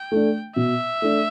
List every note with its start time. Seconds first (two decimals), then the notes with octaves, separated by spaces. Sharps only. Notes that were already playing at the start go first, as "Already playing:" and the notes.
Already playing: G5
0.12 A3 D4
0.56 B2 E5
1.02 A3 D4